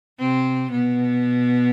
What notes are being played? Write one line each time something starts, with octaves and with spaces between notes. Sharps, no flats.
C3 C4
B2 B3